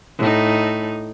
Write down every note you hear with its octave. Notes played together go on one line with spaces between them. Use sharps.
A2 D#4